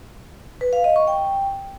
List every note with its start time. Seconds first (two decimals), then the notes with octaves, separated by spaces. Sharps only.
0.61 B4
0.73 F5
0.84 D#5
0.96 C#6
1.08 G5